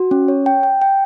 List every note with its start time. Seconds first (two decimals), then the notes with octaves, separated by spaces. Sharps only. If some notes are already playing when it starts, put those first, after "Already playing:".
Already playing: F#4
0.11 C#4
0.28 C#5
0.46 G5
0.63 G5
0.82 G5